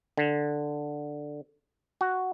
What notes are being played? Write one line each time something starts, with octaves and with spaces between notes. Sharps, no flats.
D3
F#4